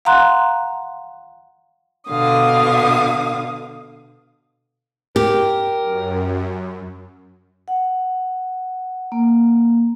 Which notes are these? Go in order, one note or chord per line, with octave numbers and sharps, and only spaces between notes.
F5 F#5 A#5 C6 F#6
B2 D3 F5 D#6
G4 A#4
F#2
F#5
A#3